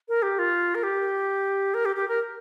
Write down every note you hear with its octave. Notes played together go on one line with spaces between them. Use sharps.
A#4
G4
F4
A#4
G4
A#4
G4
G4
A#4